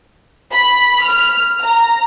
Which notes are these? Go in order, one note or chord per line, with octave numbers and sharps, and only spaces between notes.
B5
F6
A#5